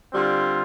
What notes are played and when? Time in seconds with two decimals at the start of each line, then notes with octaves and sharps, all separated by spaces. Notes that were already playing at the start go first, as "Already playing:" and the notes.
0.13 D3 G3 C4 F4